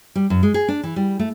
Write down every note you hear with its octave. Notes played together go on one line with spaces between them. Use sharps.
G3
F#2
G#3
G#4
D4
E3
G3
A3